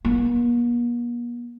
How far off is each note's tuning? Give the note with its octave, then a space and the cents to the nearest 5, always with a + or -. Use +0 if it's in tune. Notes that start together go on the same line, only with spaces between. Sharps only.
A#3 +45 D4 +0